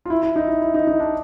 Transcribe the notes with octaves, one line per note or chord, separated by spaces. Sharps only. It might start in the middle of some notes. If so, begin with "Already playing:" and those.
F4
E4
E4
D#4
E4
E4
D#4
D#4
D4